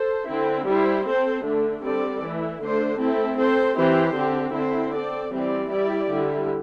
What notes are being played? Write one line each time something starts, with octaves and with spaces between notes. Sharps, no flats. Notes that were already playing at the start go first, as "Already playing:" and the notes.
Already playing: A4 C5
D3 C4 E4
G3 E4 C5
C4 A4 C5
D3 A3 D4
D3 G3 C4 A4 D5
E3 A3 E4
D3 A3 D4 C5
A3 C4 E4 A4
C4 A4 C5
E3 C4 G4 C5
D3 C4 G4
D3 C4 E4 C5
C4 A4 D5
E3 G3 C4 G4 D5
G3 E4 G4 D5
D3 G3 E4